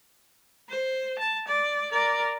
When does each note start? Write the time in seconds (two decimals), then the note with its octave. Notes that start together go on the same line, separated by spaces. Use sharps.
0.70 C5
1.19 A5
1.48 D5
1.92 A#4 D5